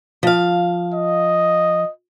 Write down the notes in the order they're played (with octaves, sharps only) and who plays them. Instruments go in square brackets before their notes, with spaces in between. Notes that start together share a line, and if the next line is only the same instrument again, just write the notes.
[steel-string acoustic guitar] F3 F5
[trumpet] D#5